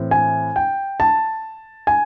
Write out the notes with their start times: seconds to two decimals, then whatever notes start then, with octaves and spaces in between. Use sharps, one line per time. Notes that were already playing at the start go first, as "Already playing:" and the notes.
Already playing: A2 E3 C4
0.11 G#5
0.56 G5
1.00 A5
1.87 G#5